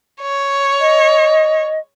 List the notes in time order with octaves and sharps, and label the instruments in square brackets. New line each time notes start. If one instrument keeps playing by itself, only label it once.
[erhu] C#5
[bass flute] D#5